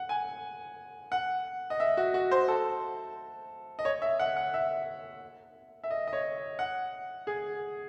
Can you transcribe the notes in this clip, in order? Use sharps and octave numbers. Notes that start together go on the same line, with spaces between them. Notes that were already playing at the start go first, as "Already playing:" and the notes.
Already playing: F#5
G#5
F#5
D#5
E5
F#4
F#4
C5
A4
D#5
C#5
E5
F#5
F#5
E5
E5
D#5
D#5
C#5
F#5
G#4